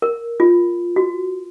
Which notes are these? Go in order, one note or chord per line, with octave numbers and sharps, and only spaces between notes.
A#4
F4
F#4